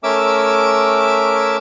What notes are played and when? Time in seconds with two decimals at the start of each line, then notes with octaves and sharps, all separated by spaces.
0.04 A3 C#4 A#4 E5 D6 E6